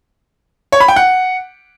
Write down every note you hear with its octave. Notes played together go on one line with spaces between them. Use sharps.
C#5
B5
G5
F#5